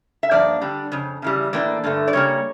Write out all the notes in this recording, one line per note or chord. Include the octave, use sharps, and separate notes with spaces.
E5
G2 F3 A#3 D4 D5
D3 G3 D4
F2 C#3
C#3 E3 G3
A2 E3 A#3 D4 D5
G2 D3 A3
D5
C#3 G3 A#3 C#5